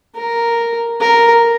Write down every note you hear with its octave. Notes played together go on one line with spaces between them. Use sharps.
A#4
A#4